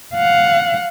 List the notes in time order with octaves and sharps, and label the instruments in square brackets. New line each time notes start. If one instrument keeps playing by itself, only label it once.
[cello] F5 F#5